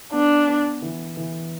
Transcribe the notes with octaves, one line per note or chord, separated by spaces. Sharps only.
B3 D4
B3
E3
E3